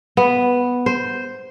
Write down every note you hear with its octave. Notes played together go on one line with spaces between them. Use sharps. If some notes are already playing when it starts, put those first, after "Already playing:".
B3
C5